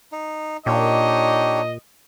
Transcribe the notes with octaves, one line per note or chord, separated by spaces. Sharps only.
D#4
A#2 D4 D#4 G4 C#5 D#5